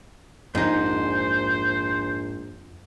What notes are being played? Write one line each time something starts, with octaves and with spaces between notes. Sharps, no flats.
A#1 F2 G#2 D#4 C5